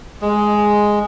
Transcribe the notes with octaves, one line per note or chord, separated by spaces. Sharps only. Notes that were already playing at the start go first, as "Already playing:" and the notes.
G#3